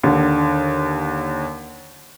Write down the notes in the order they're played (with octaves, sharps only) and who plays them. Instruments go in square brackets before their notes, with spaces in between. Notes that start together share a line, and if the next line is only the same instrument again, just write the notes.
[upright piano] D#2 D3